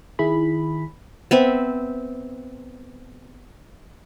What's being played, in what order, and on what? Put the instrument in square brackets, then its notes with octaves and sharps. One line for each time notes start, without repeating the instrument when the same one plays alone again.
[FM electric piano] D#3 E4 G#4 B5
[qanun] B3 C4 E5